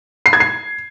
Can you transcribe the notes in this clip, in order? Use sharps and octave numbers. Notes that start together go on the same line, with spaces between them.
C7
G#6
C7